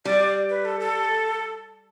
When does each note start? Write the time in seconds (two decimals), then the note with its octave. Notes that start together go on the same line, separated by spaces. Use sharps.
0.05 G3 D5
0.50 B4
0.65 A4
0.80 A4